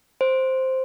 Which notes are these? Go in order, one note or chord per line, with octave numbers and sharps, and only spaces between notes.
C5